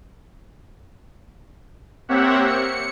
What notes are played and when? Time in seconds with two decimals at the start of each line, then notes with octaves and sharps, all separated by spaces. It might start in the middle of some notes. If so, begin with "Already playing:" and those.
2.09 A#3 C4 G4 C#5 E5 F#5
2.47 C#7